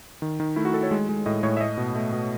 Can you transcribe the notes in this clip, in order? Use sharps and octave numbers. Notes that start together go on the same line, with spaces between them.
D#3
D#3
A3 E4
F#4
D#3 A4
C#5
G#3
G#3
A2 D#5
A2 C#5
E5
A3 D#5
B2
A3
B2